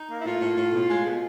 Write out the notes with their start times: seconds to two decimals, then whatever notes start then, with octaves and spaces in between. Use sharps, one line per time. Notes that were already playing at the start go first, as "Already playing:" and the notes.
Already playing: D#4
0.09 A#3
0.19 E4
0.24 A2 F4
0.40 A2
0.57 A2
0.73 B2
0.90 G#3
1.06 B2